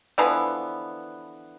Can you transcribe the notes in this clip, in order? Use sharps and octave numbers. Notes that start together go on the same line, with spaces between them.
D3 E3 F3 B3